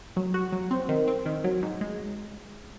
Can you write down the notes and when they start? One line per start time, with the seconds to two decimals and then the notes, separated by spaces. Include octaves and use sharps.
0.17 F#3
0.34 F#4
0.52 F#3
0.71 C4
0.89 D#3
1.08 C4
1.26 D#3
1.44 F#3
1.62 G#2
1.81 G#3